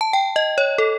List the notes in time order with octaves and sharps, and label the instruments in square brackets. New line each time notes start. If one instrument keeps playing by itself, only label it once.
[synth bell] A5
G5
D#5
C#5
A4